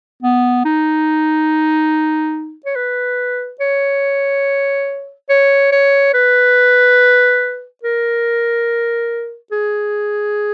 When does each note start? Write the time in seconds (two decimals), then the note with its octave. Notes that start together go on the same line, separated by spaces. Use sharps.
0.23 B3
0.65 D#4
2.66 C#5
2.76 B4
3.60 C#5
5.29 C#5
5.72 C#5
6.14 B4
7.83 A#4
9.52 G#4